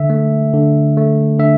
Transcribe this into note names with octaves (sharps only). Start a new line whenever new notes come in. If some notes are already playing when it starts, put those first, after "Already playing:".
Already playing: D3 E5
A3
D3
A3
D3 E5